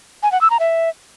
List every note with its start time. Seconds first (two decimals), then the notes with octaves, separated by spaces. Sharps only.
0.23 G#5
0.32 F#5
0.41 E6
0.50 A#5
0.60 E5